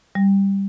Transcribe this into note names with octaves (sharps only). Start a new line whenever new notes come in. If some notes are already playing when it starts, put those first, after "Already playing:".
G3